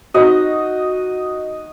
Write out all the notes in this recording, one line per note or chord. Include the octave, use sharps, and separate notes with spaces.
D#4 F#4 D#5